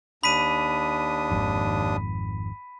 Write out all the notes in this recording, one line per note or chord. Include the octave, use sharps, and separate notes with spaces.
D#2 D4 B5 D#6 B6 D#7
G#1 F2 G#2